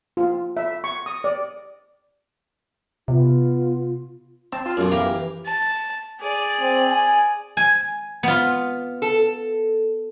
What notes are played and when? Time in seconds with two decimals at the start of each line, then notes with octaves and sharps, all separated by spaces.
0.17 F4
0.57 E5
0.84 C#6
1.06 D#6
1.24 D5
3.08 C3 B3 F4
4.53 C4 A5
4.66 F4
4.77 B1 F#2
4.92 E3 G4 A#4 F5
5.45 A5
6.20 G#4 D5
6.61 C4
6.90 G#5
7.57 G#5
8.23 B3 F4
9.02 A4